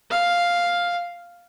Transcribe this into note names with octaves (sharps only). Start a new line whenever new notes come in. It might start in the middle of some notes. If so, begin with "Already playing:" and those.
F5